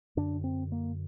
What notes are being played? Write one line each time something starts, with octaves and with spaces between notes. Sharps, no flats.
F#2 D3 D4
C4
A#3